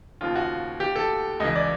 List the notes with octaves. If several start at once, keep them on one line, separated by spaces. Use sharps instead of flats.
D#2 C#3 F3 F4
F#4
G4
A4
C#2 C#3 E3 D#5
D5